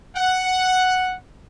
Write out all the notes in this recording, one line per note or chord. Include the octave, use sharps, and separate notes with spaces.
F#5